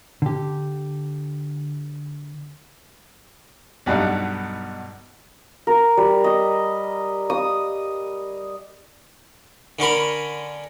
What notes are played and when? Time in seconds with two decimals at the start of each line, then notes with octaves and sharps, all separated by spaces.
0.22 D3 G4
3.86 B1 G2 B2 D#4 F5 F#5
5.67 A#4
5.97 G3
6.24 D#5
7.30 D#6
9.79 D3 C#4 A#4 B5